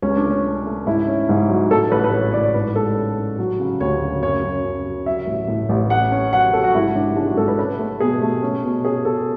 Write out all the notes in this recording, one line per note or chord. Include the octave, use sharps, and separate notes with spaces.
C#2 C#4
D4
A3
C#4
C#4
A3
G#2 E4
C#4
G#2
F#3
A2 A4
A1 B4
B4
G#3 C#5
A2 D5
G#2 B4
G#3 A4
C#4
C#4
F#3
C#3
D2 C#5
C#3
F#2 C#5
F#2
F#2
F#2
F#3 E5
A1
A2
A1
A3 F#5
C#4
F#3 F#5
F#3 A4
F#4
G#2 E4
G#2 D4
G#3 D4
F#4
G#2 A4
B4
C#4 B4
A3
B2 G#4
A3
C#4
B2
C#4 G#4
B2 A4